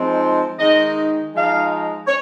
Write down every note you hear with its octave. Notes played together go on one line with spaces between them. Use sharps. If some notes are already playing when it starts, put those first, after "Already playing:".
Already playing: F3 G#3 C4 D#4
D#3 G#3 D#4 D#5
F3 G#3 D#4 F5
C#5